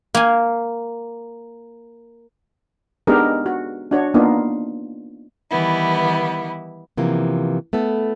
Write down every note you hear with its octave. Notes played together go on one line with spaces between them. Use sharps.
A#3 G#5
G#3 B3 D4 D#4 G4 A#4
F#4
D4 F#4 C#5
A#3 B3 D4 D#4 F4
D#3 E3 G3 B3 E4
C3 E3 F3 A#3 B3
A3 B3 E4 A4